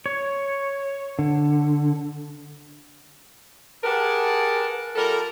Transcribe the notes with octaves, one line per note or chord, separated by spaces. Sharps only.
C#5
D3
G4 G#4 A#4 B4 F#5 A5
G3 F4 A4 A#4